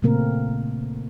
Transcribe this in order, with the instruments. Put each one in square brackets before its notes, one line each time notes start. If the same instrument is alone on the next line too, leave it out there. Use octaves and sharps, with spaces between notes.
[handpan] A#2 C#3 A3 A#3 C4 A#4